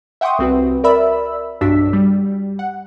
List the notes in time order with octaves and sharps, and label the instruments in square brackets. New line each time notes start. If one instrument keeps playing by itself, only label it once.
[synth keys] E5 F#5 G5 C6 C#6 D#6
C2 C4 F#4 B4
A#4 D5 E5 B5 E6
B1 G2 D4 F#4 E6 B6
G3
F#5